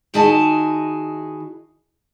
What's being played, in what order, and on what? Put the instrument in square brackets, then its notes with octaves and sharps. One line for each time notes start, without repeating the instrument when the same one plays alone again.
[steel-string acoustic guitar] D#3 E4 F#4 G#4 D#5 A5